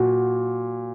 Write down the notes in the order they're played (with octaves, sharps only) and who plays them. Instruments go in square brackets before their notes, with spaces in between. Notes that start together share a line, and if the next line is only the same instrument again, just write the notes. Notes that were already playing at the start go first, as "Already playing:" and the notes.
Already playing: [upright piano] A#2 [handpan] F#4